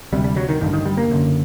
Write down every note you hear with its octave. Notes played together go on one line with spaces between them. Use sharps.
D2 C3 G3
G3
F#3
D#3
A1 G2 D3 D#3
D#3
G3
A#3
F#1 F#2 D3